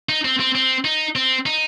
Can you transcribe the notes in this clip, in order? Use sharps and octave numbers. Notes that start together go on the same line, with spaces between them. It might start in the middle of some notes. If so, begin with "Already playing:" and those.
D#4
C4
C4
C4
D#4
C4
D#4